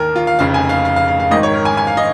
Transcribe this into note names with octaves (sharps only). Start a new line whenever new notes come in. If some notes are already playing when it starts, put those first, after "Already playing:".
Already playing: D#2 D#3 A#4
F4
F5
F1 F2 C#3 F5
G#5
F5
F5
F5
F5
F5
G#1 G#2 D#3 D#5
C#5
A#4
G#5
G#5
F5
D#5